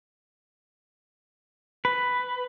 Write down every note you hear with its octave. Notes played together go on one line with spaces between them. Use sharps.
B4